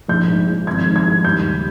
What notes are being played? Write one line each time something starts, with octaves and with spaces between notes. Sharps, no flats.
A#1 G6
G#2
F3
G#1 G#6
G#2
G#6
G3
D#2 G6
C#3